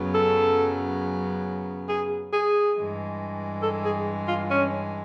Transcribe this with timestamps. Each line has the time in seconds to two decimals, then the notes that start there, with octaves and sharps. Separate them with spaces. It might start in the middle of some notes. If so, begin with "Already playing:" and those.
Already playing: F#2 C#3 F#3 B3
0.14 A4
1.89 G#4
2.33 G#4
2.76 G2 E3 G#3
3.63 A4
3.85 G#4
4.28 F4
4.51 C#4